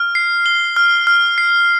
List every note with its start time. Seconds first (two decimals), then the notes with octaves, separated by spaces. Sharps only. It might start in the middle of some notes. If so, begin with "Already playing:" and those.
Already playing: F6
0.15 C7
0.46 G7
0.76 F6
1.07 F6
1.38 C7